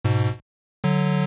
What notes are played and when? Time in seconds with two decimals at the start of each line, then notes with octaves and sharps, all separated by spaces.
0.05 G#2 B2
0.84 D3 F#3